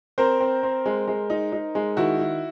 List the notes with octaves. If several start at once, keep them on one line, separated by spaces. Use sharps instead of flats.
C4 A#4 C5
C4
C4
G#3
G#3
D#4
D#4
G#3
D#3 E4 F#4
E4